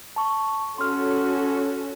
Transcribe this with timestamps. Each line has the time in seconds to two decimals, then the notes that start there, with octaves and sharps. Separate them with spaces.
0.16 A5 C#6
0.78 C#4 F#4 A4 C6 F6